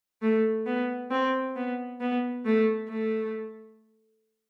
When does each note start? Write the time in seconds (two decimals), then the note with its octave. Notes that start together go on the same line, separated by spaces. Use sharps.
0.22 A3
0.66 B3
1.11 C4
1.56 B3
2.01 B3
2.45 A3
2.89 A3